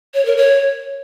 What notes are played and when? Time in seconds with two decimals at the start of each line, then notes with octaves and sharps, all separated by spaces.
0.14 C#5
0.25 A#4
0.37 C#5